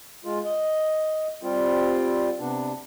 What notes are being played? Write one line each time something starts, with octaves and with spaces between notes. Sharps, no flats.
G#3 F4
D#5
G3 C4 F4
C3 B3 D4